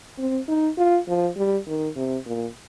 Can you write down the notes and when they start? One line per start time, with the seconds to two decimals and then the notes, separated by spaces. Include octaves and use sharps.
0.18 C4
0.48 D#4
0.78 F4
1.08 F3
1.37 G3
1.67 D#3
1.96 C3
2.26 A#2